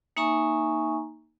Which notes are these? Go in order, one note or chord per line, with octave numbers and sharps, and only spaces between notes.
A#3 D#4 E5 G#5 A#5 C#6